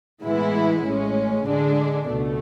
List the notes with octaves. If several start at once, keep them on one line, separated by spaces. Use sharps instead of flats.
A2 E3 G#3 B3 E4
A1 A2 G#3 C#4
D3 G#3 D4
C#2 B2 A3